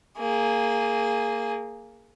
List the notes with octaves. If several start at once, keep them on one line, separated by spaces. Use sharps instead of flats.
A#3 G#4